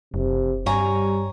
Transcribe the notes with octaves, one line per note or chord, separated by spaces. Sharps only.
F#1 C3
G2 G3 C#5 G#5 A#5